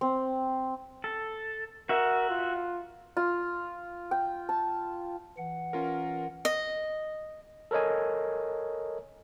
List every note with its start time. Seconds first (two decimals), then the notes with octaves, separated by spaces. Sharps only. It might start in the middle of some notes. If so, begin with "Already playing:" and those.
0.01 C4
1.04 A4
1.89 F#4 A#4 E5
2.29 F4
3.17 F4
4.11 G5
4.49 A5
5.37 E3 F#5
5.73 C#4 F4 A#4
6.45 D#5
7.71 A4 A#4 C#5 D#5 G#5